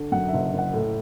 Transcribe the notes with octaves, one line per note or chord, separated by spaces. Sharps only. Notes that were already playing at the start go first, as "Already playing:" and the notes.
Already playing: D3
F#2 F#5
E5
F#1
F#1 F#5
A2